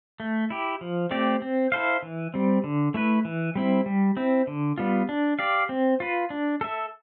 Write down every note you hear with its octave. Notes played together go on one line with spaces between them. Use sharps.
A3
E4 G4
F3
A3 C4 G4 D5
C4
E4 A4 C5 F5
E3
G3 C4
D3
A3 E4 B4
E3
G3 C4 E4
G3
C4 E4
D3
G3 B3 F4
D4
G4 D5 F5
C4
F4 B4
D4
A4 E5